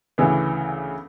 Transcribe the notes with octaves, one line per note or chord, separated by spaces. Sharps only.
D2 C#3 E3 B3